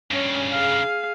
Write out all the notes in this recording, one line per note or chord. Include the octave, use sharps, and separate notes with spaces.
G2 C#3 C#4
G#4 F5